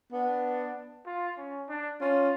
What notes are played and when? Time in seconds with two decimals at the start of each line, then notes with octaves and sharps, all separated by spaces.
0.12 B3 D4
1.06 F4
1.37 C#4
1.69 D4
2.01 C#4 F4